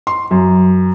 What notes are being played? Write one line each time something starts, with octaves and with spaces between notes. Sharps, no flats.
C6
F#2